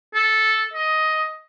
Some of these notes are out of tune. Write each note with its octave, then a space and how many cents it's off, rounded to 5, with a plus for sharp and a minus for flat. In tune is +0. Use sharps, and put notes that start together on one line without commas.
A4 -5
D#5 +10